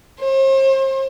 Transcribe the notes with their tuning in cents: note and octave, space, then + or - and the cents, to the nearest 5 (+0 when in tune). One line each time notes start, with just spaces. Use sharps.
C5 +40